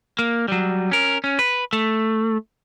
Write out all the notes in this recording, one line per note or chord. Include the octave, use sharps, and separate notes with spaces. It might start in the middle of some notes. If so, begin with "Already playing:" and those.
A#3
F#3 G3
C#4 A#4
C#4
B4
A3